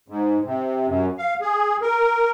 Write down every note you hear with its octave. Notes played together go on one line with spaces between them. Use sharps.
G#2
C3
F#2
F5
G#4
A#4